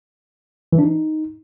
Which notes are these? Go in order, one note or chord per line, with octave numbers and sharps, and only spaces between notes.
E3
D4
D#4